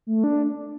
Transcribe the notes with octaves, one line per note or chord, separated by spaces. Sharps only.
A3
D4